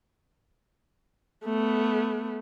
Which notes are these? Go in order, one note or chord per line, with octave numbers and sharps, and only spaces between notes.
A3 B3